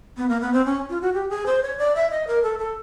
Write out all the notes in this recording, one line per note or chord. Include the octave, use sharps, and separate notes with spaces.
B3
A#3
B3
C4
C#4
F4
F#4
G4
G#4
C5
C#5
D5
E5
D#5
A#4
A4
A4